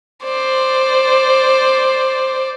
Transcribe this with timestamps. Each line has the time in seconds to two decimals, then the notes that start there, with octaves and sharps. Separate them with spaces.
0.24 C5 D5